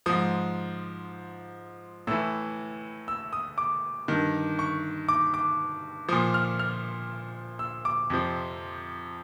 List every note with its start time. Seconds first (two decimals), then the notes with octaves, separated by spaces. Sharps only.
0.06 G#2 F3 D#6
2.07 A2 E3 E6
3.08 E6
3.33 D#6
3.58 D6
4.08 G2 D#3
4.59 C#6
5.09 D6
5.34 D6
6.08 A#2 F3 D#6
6.34 F6
6.59 F6
7.59 E6
7.85 D6
8.10 F2 C3 F3